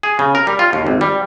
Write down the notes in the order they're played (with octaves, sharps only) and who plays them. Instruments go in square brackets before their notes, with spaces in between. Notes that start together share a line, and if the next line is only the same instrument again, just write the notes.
[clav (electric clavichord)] G#4
C#3
A#4
G3
F4
D#2
G#1
G3